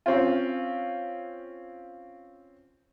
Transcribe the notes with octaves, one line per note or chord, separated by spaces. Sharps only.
C4 C#4 F4